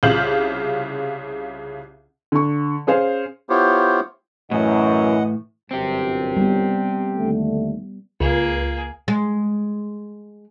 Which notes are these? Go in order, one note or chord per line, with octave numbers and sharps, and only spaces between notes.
C2 C#3 F4 F5 G6 F#7
D3 C#6
C#4 G#4 C5 F5
B3 E4 F4 G4 C5 C#5
F#2 A2 E3 D#5 F#5
G1 F#2 C4 G4
G3 B3
D#2 D3 A3
C#2 A#3 G#4
G#3